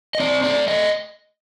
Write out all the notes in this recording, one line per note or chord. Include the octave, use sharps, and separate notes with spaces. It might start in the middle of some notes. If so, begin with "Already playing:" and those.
D#5
C4 D5
A3 D5
A3 D#5